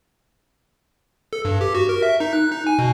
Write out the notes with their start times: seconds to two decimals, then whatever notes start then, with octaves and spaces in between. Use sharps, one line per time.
1.33 A4
1.45 G2
1.61 G4
1.75 F#4
1.89 A#4
2.02 E5
2.20 D#4
2.33 F#6
2.52 D#4
2.67 G#5
2.79 B2